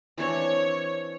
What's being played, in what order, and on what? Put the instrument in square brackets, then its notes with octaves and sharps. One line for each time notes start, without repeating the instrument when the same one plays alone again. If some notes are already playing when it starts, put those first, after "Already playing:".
[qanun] E3 C4 D4 [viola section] C#5